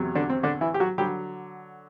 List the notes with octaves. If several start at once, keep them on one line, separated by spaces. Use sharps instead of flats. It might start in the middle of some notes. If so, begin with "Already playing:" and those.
Already playing: E2 C3 F#3
D3 D4
C4
D3 D4
E3 E4
G4
F#3 F#4
D3 F#3 G3 G4